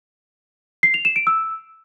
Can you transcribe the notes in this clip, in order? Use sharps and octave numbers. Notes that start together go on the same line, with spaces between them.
C7
F7
E7
D7
E6